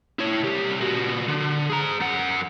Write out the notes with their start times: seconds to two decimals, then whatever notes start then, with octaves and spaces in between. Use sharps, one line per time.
0.19 E4 C#5
0.43 C2 G4
0.81 A#2 F#4
1.28 D3
1.70 G#4 A#5
2.00 F#2 F#5